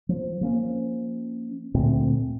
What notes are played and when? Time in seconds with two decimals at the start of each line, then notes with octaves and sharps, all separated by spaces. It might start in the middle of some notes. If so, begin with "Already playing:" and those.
0.09 F3
0.41 F3 A#3 C#4
1.74 D2 A#2 A3 C4